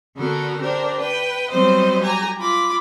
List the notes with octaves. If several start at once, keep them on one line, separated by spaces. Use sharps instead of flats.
D3 B3 F#4 A4 A#4
D4 G4 A#4 C5
B4 G5
F#3 G3 B3 C4 C5 D#5
G4 G#5 A#5
F4 B5 D6